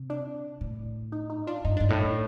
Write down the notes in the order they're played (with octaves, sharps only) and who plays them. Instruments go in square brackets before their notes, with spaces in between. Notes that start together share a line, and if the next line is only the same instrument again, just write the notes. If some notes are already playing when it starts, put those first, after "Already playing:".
Already playing: [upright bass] C3
[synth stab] D4
[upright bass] A2
[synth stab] D#4
D#4
D4 F4
[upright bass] G2 [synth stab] D#4
[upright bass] G2 [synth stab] D4
[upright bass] A2 [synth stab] D#4